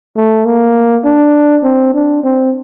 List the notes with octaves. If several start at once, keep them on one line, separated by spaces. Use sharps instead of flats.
A3
A#3
D4
C4
D4
C4